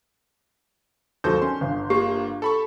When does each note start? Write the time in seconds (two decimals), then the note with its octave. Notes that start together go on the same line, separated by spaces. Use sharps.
1.24 D#2 F#3 A4 C5 G6
1.42 C#4 C6
1.61 G1
1.90 A#3 F4 G4
2.42 A4 B5 C#6